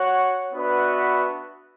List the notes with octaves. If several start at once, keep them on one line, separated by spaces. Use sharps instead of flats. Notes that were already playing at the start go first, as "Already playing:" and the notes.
Already playing: F#4 C#5 F#5
B3 D4 F#4 B4 E5